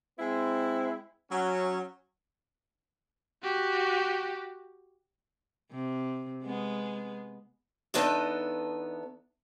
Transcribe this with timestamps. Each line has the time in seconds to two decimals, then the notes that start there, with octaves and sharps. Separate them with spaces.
0.18 G#3 C4 E4
1.30 F#3 C#4
3.43 F#4 G4
5.71 C3
6.43 G#3 B3
7.94 E2 B3 D4 D#4 A4